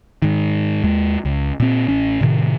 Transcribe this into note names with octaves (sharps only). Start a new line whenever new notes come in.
G#2 D#3
D#2 G#3
C#2
A#2 C4
A1 C#4
A2 C3 D#3